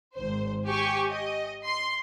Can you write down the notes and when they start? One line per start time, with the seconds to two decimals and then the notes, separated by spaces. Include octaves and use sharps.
0.15 G#1 C5
0.68 G4 G5 G#5 C#6
1.11 D#5
1.67 C6